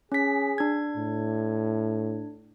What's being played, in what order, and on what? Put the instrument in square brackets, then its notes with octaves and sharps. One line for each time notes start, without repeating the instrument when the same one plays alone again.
[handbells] C#4 B6 [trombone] G#4
[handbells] D4 G#6
[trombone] A2